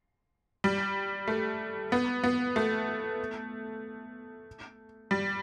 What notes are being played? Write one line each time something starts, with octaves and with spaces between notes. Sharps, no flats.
G3
A3
B3
B3
A3
G3